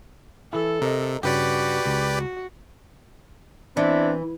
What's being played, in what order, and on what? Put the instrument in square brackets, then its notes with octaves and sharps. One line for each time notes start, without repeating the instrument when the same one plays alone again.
[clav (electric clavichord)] E3 E4 [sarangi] A4
[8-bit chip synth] C3 [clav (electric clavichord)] A#4 D#5
[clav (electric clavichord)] G2 C#3 [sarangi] F#4 [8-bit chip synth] G4 B4 D5
[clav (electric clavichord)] C#2
[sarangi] F#4
[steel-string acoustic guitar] E3 [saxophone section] B3 C4 E4 [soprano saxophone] D4